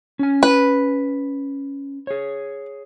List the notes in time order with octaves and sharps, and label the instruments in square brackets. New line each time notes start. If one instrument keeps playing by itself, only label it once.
[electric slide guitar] C#4 G#5
[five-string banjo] B4
[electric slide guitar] G#4 C#5